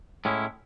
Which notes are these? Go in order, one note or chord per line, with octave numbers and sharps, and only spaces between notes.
A2 G#3 C#4 E4